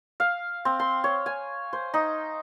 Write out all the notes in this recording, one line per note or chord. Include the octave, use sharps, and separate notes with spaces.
F5
C4
C6
C#5
G#5
C5
D#4